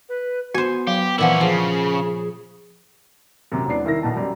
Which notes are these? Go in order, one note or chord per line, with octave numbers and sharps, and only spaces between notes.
B4
B3 F#4 C5 G#5
F#3 G4 F5
A#2 E3 F3 C#4 E4 F#5 D6
C#3 F3 G#4
F#2 C3
E1 E2 B3 D4 C7
C2 D#3 E4 A#4 A#6
B1 B2 A5
F#2 G3